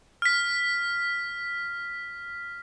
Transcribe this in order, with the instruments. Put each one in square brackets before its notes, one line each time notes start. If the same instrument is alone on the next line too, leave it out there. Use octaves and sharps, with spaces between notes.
[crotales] F6 B6